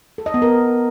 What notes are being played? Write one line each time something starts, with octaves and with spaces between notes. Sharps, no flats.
A4
D#5
B3
A#4